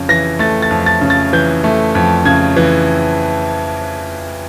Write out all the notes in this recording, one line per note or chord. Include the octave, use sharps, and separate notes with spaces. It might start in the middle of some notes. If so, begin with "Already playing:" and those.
Already playing: F2 C#3
E3 A#6
A3 A6
A6
F2
A6
C#3
A6
E3 G6
A3
F2
C#3 G#6
E3